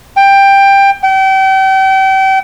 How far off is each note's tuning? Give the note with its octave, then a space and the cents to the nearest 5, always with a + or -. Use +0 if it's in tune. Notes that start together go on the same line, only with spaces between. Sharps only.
G5 +15
G5 -35